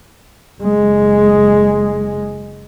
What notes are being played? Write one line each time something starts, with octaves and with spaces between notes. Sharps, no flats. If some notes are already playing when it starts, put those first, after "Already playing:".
F#1 G#3